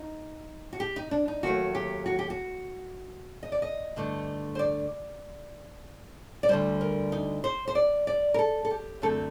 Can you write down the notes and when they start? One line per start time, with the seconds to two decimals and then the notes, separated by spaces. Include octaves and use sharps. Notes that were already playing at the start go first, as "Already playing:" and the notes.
Already playing: D#4
0.73 F#4
0.80 G4
0.96 D#4
1.11 D4
1.28 D#4
1.43 D#2 D#3 F#3 A3 F#4
1.75 G4
2.06 F#4
2.19 G4
2.30 F#4
3.43 D#5
3.52 D5
3.62 D#5
3.96 G2 D3 A3 D4
4.55 C5
4.59 D5
6.43 D5
6.48 D2 D3 G3 C5
6.81 A#4
7.12 D#4
7.44 C5
7.68 C5
7.75 D5
8.07 D5
8.34 A#4
8.39 A4
8.65 A4
8.70 G4
9.02 F#2 D3 A3 C4 A4